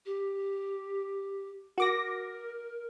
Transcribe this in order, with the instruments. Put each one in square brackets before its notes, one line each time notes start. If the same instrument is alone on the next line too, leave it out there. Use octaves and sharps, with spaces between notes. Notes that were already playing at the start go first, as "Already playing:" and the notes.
[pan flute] G4
[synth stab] F#4 D6 A#6 [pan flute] A#4